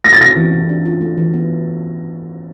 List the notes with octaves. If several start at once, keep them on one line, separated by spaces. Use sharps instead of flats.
A3 A#6
A6
C3 A#6
E3
C3
D4
F4
A3
E3
B3